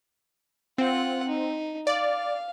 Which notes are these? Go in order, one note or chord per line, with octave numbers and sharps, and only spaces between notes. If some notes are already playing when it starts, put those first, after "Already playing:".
C4 F4 F#5
D#4
D5 F5